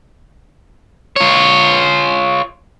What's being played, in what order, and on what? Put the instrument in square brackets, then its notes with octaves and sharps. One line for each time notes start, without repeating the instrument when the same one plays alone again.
[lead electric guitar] F4 C#5